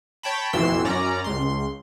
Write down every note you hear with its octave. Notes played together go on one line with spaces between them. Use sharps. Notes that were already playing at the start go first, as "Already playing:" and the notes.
C#5 G5 A5 B5
A1 F2 B2 E3 C6 E6
F#2 C#4 D5 A#5
C#2 C6